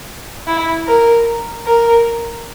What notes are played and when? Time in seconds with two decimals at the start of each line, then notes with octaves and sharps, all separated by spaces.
0.47 E4
0.87 A#4
1.66 A#4